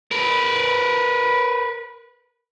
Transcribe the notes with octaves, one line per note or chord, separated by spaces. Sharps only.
A#4 B4